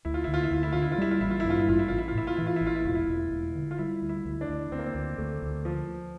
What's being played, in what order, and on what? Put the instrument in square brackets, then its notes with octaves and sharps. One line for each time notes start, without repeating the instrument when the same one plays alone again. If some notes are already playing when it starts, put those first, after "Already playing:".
[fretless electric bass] D2 [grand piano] E4
[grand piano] F4
[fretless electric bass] D2 [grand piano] E4
[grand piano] F4
E4
[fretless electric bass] D2 [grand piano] F4
[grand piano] E4
[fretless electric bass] D3 [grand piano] F4
[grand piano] E4
F4
[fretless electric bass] G3 [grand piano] E4
[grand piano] F4
[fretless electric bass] A1 [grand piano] E4
[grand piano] F4
E4
[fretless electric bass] G2 [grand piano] F4
[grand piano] E4
[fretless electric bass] A1 [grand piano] F4
[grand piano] E4
[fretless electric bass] A1 [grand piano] F4
[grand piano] E4
F4
[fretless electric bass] A2 [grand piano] E4
[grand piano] F4
[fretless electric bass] E3 [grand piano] E4
[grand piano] F4
E4
[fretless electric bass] A1
[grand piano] F4
E4
[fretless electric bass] E1 [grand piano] F4
[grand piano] E4
[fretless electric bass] E1
E1
D3
[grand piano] F4
[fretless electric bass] G3 [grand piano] E4
[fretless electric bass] D2
[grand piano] E4
[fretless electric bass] D2
[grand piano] D4
[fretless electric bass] D2
[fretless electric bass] D2 [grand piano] C4
[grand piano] A#3
C4
[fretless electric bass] D2
[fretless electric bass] D2 [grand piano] A3
[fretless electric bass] D2
[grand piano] F3